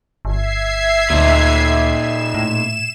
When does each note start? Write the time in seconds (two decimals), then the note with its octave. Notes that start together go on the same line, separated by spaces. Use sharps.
0.25 G1 E5 G#6 C7
1.10 D2 A#2 D#4
1.90 E7
2.34 A2